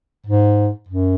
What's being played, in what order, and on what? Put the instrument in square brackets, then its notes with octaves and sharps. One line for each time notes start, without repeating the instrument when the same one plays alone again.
[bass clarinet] G#2
F#2